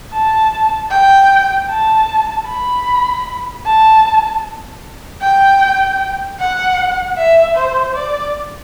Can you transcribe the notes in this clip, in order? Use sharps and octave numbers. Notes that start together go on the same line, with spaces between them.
A5
G5
A5
B5
A5
G5
F#5
E5
C5
D5